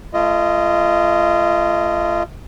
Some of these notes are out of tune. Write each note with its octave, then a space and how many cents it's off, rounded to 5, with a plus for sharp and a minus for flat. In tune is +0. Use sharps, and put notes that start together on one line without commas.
A3 +0 F4 -30 D#5 +0